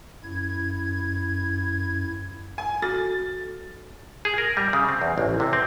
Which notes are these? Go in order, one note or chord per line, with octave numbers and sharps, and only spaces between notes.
F#2 E4 G#6
G#5
F#4 A4 A6
G#4
A#4
G3
C#3
C4
E2
A1
C3
C4